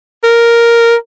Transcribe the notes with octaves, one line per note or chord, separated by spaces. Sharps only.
A#4